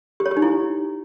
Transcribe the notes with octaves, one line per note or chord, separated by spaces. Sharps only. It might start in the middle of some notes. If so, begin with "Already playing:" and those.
G4
C#5
G4
D#4
E4